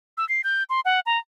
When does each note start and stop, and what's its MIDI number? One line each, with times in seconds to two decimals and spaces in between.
0.18 0.27 88
0.29 0.41 96
0.44 0.63 91
0.70 0.80 84
0.85 1.00 78
1.06 1.18 82